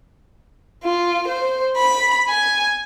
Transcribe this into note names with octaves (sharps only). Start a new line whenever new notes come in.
F4
C5
B5
G#5